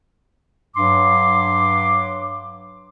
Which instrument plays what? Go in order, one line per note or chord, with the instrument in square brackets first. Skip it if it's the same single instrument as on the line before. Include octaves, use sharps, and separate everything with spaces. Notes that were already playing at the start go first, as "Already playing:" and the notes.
[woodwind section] G2 F#3 C6 D6